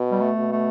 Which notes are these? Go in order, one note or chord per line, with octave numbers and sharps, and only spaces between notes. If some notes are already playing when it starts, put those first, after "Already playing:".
Already playing: B2
G3
A3
B2
A3